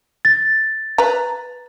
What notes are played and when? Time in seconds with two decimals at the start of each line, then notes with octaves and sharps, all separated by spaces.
0.25 A6
0.98 B4 A#5